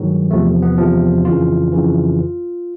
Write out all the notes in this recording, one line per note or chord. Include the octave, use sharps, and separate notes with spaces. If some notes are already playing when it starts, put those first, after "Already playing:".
Already playing: G2 D#3 F#3 G#3
E2 C3 F3 A3
B3
E2 C3 F3
F2 C#3 E3 F4
F2 C#3 E3